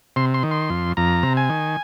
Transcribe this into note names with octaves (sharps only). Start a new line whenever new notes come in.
C3 C6
C6
D#3
C6
F2
F2 A#5
C3
G#5
D#3